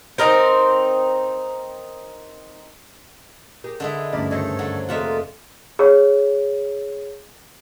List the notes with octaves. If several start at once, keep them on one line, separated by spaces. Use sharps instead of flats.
C4 D#4 A#4 C5
G4 G#4 A#4
D3 G#3 E4
D2 G2 C#3 F3 D4 A#4 D5 B5
G#2 D#3 F#4 A4 C5 C#5
D3 F#3
F1 G#3 A#3 F4 F#4 A4 E5 F#5
G#4 C#5